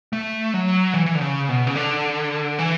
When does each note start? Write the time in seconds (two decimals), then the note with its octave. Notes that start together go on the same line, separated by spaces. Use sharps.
0.13 A3
0.54 F#3
0.94 E3
1.06 E3
1.15 D3
1.21 C#3
1.49 B2
1.67 C#3
1.76 D3
2.59 E3